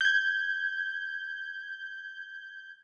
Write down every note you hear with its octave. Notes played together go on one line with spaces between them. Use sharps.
G6 G#6